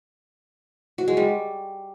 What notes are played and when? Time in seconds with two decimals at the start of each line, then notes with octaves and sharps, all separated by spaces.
0.98 F#4
1.08 G#3
1.17 G3